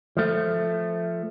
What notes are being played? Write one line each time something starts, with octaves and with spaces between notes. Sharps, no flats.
F3 A3